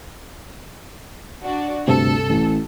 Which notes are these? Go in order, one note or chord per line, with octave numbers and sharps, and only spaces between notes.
D4 F#4
D2 G2 C3 A4
A1